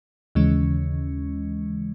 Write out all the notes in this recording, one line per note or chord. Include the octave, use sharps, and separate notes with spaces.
D#2 C#3 E3 G#3 C#4